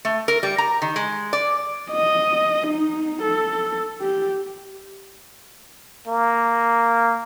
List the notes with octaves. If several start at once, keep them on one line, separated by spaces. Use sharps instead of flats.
A3
A#4
G3
A#5
D#3
G#3
D5
D#5
D#4
A4
G4
A#3